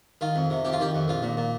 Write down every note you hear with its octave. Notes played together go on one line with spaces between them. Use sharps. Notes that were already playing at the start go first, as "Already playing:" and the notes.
D#3 F4
F2
C3
F2 G4
F4
D#3 G4
F2
A#1 F4
A#2
A#2